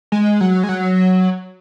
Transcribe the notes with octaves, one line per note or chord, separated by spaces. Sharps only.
G#3
F#3
G#3
F#3